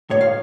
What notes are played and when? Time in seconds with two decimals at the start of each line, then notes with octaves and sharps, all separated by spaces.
0.10 A2 C#5
0.21 F5